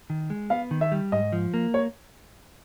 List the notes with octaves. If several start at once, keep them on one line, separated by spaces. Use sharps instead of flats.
D#3
G#3
B3 F5
D#3
E5
G3
G#2 D#5
F3
A#3
C#5